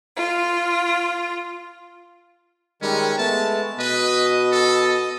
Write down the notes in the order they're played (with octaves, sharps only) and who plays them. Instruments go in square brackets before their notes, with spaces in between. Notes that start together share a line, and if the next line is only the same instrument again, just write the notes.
[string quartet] F4
[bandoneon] D#3 G3 G#3 [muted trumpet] C#4
[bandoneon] G#3 A3 [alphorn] B3 [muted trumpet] A5
[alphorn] B2 [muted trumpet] B4 [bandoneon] D#5 D#6
[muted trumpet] A4